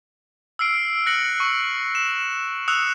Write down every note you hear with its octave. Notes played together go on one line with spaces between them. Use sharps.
E6 F6 C7 D7
F#6 A#6 C#7 F#7
C#6
E7
D#6 E6 F#6 C#7 F7